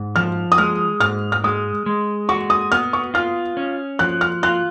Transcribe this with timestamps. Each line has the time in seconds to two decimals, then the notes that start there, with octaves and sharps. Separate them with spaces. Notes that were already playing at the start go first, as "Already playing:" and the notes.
Already playing: G#2
0.16 F3 F6
0.52 D#6
0.58 G#3 F6
1.00 G#2 F6
1.32 F6
1.44 G#3 D#6
1.86 G#3
2.29 F#4 C#6
2.50 D#6
2.72 B3 F6
2.93 C#6
3.14 F4 F6
3.57 C#4
3.99 F3 F#6
4.21 F6
4.43 F4 F#6